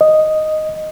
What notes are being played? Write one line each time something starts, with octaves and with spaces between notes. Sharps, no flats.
D#5